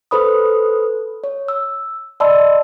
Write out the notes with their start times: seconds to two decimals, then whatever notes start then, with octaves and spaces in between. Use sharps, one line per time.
0.11 A4 B4 C5 B5 D#6
1.24 C#5
1.48 E6
2.20 D5 D#5 A5 B5 C6 E6